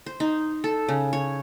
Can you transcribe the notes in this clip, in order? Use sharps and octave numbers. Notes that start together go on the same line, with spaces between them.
C5
D#4
A4
C#3
C#5